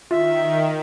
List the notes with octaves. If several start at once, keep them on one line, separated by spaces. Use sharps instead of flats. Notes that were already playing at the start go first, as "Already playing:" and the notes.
D#3 F4 E5